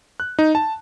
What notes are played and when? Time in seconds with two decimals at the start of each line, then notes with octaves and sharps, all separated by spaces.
0.20 F#6
0.39 D#4
0.55 A5